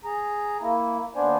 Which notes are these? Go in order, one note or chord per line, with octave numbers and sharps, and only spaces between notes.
G#4 A#5
A#3 E4
D#2 B3 D4 C5 D5 G#5